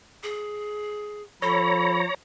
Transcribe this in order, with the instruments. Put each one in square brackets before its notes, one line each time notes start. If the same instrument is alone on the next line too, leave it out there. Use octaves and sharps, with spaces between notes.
[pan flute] G#4
[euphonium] F3 [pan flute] A4 [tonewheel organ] C#5 A#5 [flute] B5